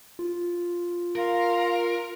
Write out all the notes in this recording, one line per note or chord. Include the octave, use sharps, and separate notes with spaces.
F4
A#4 F5 A#5 C6